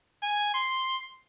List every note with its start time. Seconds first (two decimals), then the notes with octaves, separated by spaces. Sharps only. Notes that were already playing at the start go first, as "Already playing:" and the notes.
0.23 G#5
0.54 C6